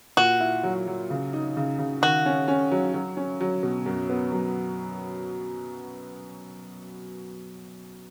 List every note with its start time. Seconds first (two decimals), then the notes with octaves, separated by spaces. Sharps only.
0.17 A#2 F#4
0.40 E4
0.63 F#3
0.87 F#3
1.10 C#3
1.33 D#4
1.57 C#3
1.79 C#3
2.02 D#3 F#4
2.26 C#4
2.48 C#4
2.71 F#3
2.94 F#3
3.17 C#4
3.41 F#3
3.63 B2
3.86 F#2
4.10 B3
4.32 F#2